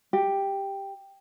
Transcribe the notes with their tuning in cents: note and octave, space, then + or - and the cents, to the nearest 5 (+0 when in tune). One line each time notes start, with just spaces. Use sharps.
G4 +5